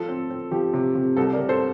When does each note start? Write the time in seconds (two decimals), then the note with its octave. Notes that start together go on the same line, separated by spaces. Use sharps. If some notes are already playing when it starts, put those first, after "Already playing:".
Already playing: F3 A4
0.08 C4
0.30 C4
0.51 F3 G4
0.73 C3
0.95 C3
1.17 C2 A4
1.33 A#4 D5
1.38 C3
1.49 A4 C5